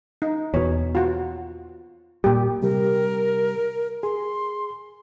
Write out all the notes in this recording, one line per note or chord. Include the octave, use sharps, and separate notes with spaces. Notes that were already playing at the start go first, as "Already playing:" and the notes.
D#4
E2 B2 C#5
F4 F#4
A#2 G3 G4
C3 G3 G4 A#4
G#4 C6